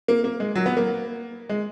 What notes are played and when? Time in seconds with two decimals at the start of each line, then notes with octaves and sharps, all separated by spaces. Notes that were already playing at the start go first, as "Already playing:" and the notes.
0.08 A#3
0.24 A#3
0.40 G#3
0.55 F#3
0.66 B3
0.77 A#3
1.49 G#3